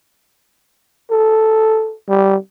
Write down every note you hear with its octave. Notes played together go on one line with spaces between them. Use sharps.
A4
G3